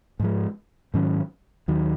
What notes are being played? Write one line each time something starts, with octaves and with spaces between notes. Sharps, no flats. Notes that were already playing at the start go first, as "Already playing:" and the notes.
G#2 F3 G#3
G#2 D#3 F#3 C#4
D#2 D#3 F#3